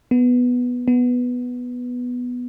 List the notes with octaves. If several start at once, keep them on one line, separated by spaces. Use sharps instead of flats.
B3
B3